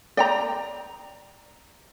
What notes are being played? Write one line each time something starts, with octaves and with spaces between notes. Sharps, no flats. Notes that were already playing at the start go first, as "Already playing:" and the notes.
D5 G5 A#5